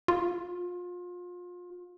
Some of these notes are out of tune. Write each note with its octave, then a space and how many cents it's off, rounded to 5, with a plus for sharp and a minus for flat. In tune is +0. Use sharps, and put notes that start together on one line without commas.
F4 +30